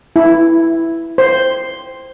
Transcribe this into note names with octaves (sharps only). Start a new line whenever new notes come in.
E4
C5